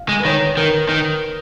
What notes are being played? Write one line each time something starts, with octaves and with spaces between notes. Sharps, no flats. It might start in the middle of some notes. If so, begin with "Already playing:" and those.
Already playing: F5
G#3
B4
D#3 C#5
B4
D#3 A#4
D#3